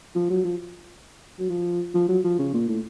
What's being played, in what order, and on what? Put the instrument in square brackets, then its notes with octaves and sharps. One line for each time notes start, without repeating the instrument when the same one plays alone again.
[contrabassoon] F3
F#3
F3
F#3
F3
F3
F#3
F3
C#3
A#2
A2